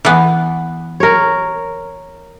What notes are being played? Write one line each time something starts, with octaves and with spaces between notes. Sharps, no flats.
E3 B3
A#4 C#5